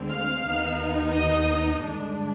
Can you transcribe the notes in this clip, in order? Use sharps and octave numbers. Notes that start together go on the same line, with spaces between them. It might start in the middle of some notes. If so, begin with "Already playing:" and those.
Already playing: D2 D3 G#3 C4
F5 F6
D#2 D#3 B3 D#4
D#5 D#6
G2 D3 G#3 D4